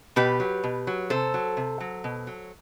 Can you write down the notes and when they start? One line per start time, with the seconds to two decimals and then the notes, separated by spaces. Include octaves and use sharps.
0.16 B2 G4 B4
0.40 F#3
0.64 B2
0.87 F#3
1.10 C3 A4 C5
1.34 F#3
1.57 C3
1.80 F#3
2.04 B2
2.27 F#3